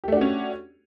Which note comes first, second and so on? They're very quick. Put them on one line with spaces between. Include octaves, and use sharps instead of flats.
G4 A3 D4 F#4 C#4